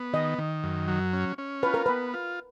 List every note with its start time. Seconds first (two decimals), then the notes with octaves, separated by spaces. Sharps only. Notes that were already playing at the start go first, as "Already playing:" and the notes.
Already playing: B3
0.13 D#3 D#5
0.38 D#3
0.64 F#2
0.88 F#3
1.13 C#4
1.38 C#4
1.63 F4 B4
1.74 A#4
1.86 B3 B4
2.13 F4